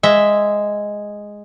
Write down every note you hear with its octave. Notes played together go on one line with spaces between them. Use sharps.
G#3 E5